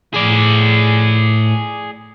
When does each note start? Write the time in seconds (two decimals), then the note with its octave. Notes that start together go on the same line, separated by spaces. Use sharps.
0.14 A2 G#4 D5